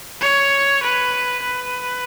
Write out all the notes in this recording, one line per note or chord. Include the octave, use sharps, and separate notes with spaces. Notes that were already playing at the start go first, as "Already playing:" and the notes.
C#5
B4
B4